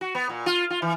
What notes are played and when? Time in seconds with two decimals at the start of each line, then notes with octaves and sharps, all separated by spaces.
0.01 F#4
0.15 B3
0.29 A#2
0.46 F4
0.70 F4
0.82 E3